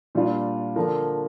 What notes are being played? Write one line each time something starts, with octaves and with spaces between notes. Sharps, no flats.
A#2 G3 D4 F4
D3 F3 A#3 D4 A#4